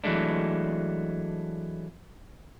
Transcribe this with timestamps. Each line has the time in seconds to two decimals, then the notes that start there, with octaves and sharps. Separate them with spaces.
0.04 E3 F#3 G#3 A3 D4